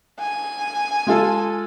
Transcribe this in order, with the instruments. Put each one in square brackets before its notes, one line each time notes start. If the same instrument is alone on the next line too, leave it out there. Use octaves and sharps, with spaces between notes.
[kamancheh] G#5
[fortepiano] G#3 F4 A4